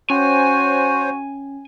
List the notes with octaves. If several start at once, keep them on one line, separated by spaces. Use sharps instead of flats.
C#4 F#4 C5 C#5 G#5